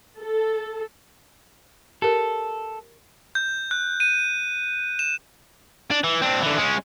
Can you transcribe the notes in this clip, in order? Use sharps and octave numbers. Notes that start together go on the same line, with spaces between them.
A4
G4 A4 A#4
G6
F#6
D#7
E7
D4
E3
C4 D4
D3 E3
G#3 C#4